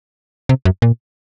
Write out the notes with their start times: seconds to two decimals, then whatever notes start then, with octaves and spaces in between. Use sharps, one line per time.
0.49 C3
0.65 F#2
0.82 A#2